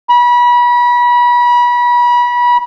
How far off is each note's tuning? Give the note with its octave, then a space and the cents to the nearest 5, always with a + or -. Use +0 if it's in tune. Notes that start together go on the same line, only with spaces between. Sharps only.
B5 -30